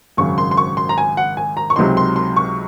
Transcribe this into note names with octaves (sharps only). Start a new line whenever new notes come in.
G#1 F#2 C#3 F#3 C#6
C6
C6
C#6
C6
A#5
G#5
F#5
G#5
A#5
C#6
C#2 C3 F#3 C4 D#4 C6
C6
C6
C#6